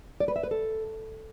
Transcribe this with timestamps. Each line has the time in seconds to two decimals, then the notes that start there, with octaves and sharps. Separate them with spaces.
0.20 D5
0.28 B4
0.36 E5
0.43 B4
0.51 A4